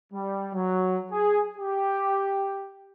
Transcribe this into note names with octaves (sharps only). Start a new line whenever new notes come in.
G3
F#3
G#4
G4